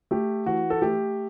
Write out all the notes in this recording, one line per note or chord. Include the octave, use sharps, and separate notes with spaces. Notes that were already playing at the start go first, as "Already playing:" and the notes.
A3 G4
E3 F#4
A4
A3 G4